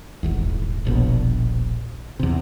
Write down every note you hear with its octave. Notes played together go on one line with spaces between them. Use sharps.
D#1 G#1 E2
D#1 A#1 B2
E2 C3